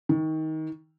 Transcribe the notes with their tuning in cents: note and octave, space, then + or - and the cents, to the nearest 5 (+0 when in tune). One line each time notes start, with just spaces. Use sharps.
D#3 +20